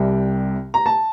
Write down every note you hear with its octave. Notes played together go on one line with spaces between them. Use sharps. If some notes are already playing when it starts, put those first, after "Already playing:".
Already playing: C2 C3 G3 G5
A#5
A5